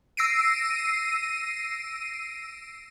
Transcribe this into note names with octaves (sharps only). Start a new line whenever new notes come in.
E6 A#6 C7 D7 D#7